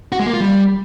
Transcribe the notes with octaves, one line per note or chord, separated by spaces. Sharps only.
F#4
G#3
A#3
F4
G3